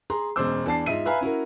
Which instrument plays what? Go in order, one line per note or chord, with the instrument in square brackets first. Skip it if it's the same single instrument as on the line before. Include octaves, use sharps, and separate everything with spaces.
[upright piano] G#4 A#5 C6
E1 F#2 G#3 C5 D6 E6
E2 D4 A5 C7
G#2 F4 D#5 E5 D#7
B4 E5 F5 G#5 A#5 B5
C#4 E4 F#4 A#4